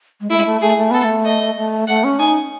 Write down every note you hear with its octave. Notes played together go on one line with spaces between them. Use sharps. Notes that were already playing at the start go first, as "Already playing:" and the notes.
G#3
A3 E4
G#3
A3
A3 G#4
A3
B3 A4
A3
D#5
A3
A3 F#5
C#4
D#4 G#5